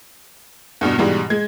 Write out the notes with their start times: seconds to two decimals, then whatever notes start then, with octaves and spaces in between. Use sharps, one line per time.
0.81 E2 G2 B2
0.98 G#2 B2 E3 G3 G#3
1.30 G#3 G#6